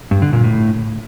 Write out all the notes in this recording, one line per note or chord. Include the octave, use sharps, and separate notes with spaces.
G2
D3
A#2
A2